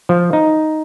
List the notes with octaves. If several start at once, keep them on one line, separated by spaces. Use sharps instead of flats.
F3
D#4